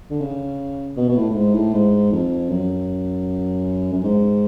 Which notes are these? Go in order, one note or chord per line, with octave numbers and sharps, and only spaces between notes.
D3
C#3
B2
B2
A2
A2
G#2
A2
G#2
F2
F#2
F#2
G#2